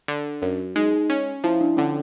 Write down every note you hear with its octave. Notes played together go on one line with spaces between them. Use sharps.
D3
F#2
G#3 D#4
C#4
F3 E4
D4
D3 C#4